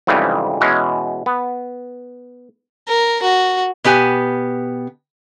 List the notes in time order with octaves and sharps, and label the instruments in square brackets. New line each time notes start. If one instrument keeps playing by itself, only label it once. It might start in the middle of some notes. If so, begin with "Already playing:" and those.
[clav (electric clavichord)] F2 G#2 C#3 E3 G3
B2 E3 G#3 C#4
B3
[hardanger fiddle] A#4
F#4
[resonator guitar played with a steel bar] B2 B3 G4 G#5